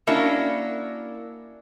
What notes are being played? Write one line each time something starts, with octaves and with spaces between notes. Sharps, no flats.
A#3 C#4 D4 E4 F#4 A#4